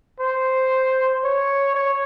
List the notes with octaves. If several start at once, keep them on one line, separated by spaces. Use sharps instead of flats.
C5
C#5
C#5